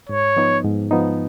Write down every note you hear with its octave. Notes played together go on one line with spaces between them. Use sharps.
G#2 C#5
F3 B3 D#4
G#2
F3 B3 D#4